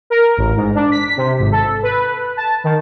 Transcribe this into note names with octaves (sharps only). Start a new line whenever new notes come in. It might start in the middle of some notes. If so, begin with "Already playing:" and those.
A#4
A1
G#2
D4
B6
C3
G#1
A4
B4
A5
D#3